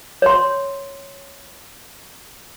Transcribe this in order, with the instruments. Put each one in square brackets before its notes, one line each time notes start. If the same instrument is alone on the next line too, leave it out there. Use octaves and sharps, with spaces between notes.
[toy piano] C#5 C6